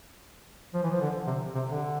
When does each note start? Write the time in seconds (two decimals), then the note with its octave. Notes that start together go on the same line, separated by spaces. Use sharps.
0.73 F3
0.83 E3
0.91 F3
1.01 D3
1.27 C3
1.54 C3
1.68 D3